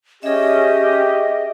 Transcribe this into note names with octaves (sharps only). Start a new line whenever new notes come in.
C#4 G4 G#4 D#5 E5